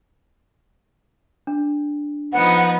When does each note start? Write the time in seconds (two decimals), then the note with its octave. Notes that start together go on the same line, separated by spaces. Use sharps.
1.47 D4
2.33 F3 B3 D#4 F#5